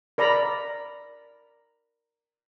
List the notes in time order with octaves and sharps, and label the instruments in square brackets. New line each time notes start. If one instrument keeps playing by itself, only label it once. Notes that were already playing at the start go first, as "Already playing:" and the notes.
[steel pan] A#4 D5 A#5 B5